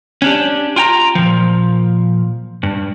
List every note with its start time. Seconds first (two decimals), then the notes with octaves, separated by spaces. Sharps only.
0.22 C#4 D4 G4
0.76 F4 G5 G#5 A#5
1.15 A#2 F3
2.63 G2